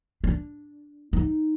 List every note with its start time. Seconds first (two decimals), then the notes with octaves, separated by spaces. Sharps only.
0.24 D4
1.13 D#4